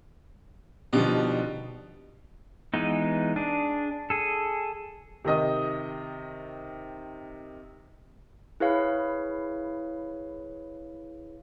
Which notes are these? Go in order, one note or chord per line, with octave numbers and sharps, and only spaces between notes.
B2 D3 F3 G3 D#4
E3 G#3 B3 D#4
D4 G#4
G#4 A4
C3 D#3 D#5 D#6
E4 G#4 B4 C#5 F5